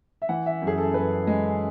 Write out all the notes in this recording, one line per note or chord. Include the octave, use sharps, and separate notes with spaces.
E5
E3 F#5
E5
F#2
G#4
A4
F#2 B4
G#3